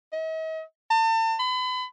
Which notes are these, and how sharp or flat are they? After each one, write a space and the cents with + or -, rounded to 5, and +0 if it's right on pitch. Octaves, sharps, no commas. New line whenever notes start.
D#5 +45
A5 +35
B5 +35